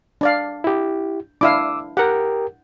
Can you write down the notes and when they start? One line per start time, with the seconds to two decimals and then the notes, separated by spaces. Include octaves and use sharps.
0.21 D4 D5 F5
0.64 E4 G4
1.41 D4 E4 F5 D6 E6
1.97 G4 A#4 F#5 G5